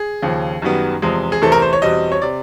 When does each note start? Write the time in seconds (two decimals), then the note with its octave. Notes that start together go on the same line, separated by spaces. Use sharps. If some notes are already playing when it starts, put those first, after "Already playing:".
Already playing: G#4
0.22 D#2 C#3 F3
0.62 F#2 D#3 G3 B3
1.02 E2 C3 F3 G#3
1.32 G#4
1.42 E2 C3 E3 A3 C4 A4
1.52 A#4
1.62 C5
1.73 C#5
1.82 E2 B2 G3 C4 D#5
2.12 C#5
2.22 C3 D5